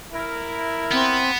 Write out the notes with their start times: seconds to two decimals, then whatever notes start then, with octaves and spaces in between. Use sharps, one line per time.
0.13 E4 A#4
0.91 B3 C4